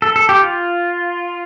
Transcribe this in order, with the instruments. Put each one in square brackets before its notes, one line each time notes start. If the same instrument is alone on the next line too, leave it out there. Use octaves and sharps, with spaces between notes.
[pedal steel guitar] A4
A4
G4
F4